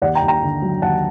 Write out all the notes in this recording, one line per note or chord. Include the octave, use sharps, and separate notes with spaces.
D#2 D5 F#5
G5 A#5
D#2
G5 A#5
D3
F#3
D#2 F#5 A5